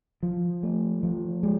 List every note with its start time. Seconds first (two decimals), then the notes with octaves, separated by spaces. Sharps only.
0.23 F3
0.63 A3
1.03 F3
1.43 G#3